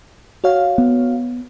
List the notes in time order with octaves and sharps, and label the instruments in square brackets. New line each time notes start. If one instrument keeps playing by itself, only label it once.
[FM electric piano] F#4 C#5 F5
[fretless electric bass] B3